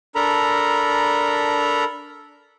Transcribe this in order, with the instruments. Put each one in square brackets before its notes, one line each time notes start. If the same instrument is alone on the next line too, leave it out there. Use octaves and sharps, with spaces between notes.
[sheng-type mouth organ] D4 A4 A#4 A#5 B5